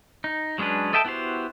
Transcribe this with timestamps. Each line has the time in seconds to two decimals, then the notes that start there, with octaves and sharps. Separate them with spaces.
0.24 D#4
0.58 F#3 G#3 C#4 D4 B4
0.93 A4 D#5 E5 G5 A5
1.05 B3 E4 F#4 G4 C5